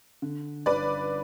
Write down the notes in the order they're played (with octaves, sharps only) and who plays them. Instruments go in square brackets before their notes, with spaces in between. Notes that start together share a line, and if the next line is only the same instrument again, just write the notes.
[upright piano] D3
[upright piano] G1 [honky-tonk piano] B4 D5